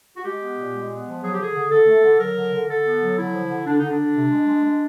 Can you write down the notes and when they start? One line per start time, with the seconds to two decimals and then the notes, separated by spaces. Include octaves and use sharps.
0.16 F#4
0.23 G#3 G4
0.40 B3
0.56 A#2
0.73 G#3
0.89 B3
1.05 F3
1.21 F#3 G#4
1.32 G4
1.38 D3 G#4
1.54 D3
1.70 D3 A4
1.86 A3
2.03 D3
2.19 F#3 A#4
2.35 D3
2.52 D3
2.68 D3 A4
2.84 B3
3.01 F#3
3.17 D3 E4
3.33 F3
3.49 D3
3.66 D3 D4
3.77 D3 D#4
3.88 D4
3.98 D3
4.14 C3
4.31 G#3
4.46 G#3
4.64 G#3